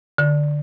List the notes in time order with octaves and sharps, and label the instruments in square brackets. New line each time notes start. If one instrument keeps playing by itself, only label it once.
[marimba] D3